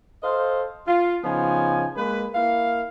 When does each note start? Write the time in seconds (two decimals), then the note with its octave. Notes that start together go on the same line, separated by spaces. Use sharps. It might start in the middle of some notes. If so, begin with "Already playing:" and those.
0.23 A4 C5 D#5 F5
0.87 F4
1.24 C#3 F3 B3 D#4 G#5
1.96 G#3 A#3 B4
2.35 A#3 E4 F5